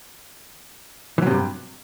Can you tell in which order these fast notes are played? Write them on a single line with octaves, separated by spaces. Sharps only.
E3 F#3 C3 G2